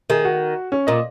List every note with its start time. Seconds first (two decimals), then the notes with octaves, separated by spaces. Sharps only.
0.10 D#3 G#4
0.25 F#4
0.72 C#4
0.87 A#2 D#5